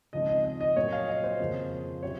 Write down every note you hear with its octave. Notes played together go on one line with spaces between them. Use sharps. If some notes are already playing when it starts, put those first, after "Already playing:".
C#2 C#3 F3 C4 D#4 D#5
D#5
D#5
D#5
A#2 F#3 A#3 C#5
F5
D#5
C5
F2 C#3 F3 A#3
C3 F#3 C#5